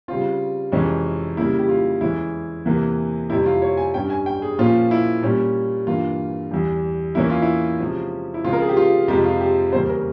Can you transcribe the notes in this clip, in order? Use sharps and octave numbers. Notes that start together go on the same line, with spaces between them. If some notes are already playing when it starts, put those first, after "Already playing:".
C#3 G3 C4 F4
F2 C3 E3 G#3 C#4
C#3 G3 A#3 E4
G4
F4
E2 E3 G#3 C#4 E4
E2 C3 E3 A#3
F2 C3 G3 E4
F4
C#5
G#5
G2 G3 C#4 G5
G#5
G5
G#4
A#2 F3 A#3 C#4 F4
E4
A#2 G3 C#4
G2 E3 A#3 F4
E2 E3 G3
E2 E3 A#3 C#4 E4
F4
E4
C3 F3 G#3 C#4
E4
C#3 F3 G#3 C4 F4
A#4
G#4
G4
F4
F2 C3 F3 G#3 G4
F4
G4
E2 C#3 G3 A#3 C#4 C5
A#4